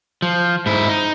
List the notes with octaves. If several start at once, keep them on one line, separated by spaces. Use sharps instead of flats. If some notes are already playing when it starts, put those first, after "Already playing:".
F3
G#2 E4
D#4